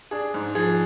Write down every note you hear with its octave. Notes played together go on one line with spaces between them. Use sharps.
D4 G#4
G#2
F3 G#4